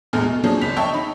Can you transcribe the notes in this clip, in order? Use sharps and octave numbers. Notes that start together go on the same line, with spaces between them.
A#1 E2 G#3 A3 G#5 F6
B2
F3 F#3 A#3 C#4 D4 G#4
G#1 C#2 B6 F7
C#5 D#5 E5 G5 A5 C#6
D#4 B5